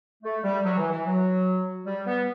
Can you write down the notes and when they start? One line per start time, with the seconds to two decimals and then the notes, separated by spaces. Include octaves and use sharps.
0.24 A3
0.44 G3
0.64 F#3
0.77 E3
0.91 E3
1.05 F#3
1.86 G3
2.06 B3